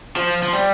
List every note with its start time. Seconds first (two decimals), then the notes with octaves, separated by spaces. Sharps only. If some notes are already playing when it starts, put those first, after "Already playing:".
0.17 F3
0.43 F3
0.53 G3